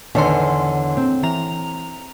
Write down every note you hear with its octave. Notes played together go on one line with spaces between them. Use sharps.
E2 D3 D#3 C#5 C6
C4
E3 A#5 F7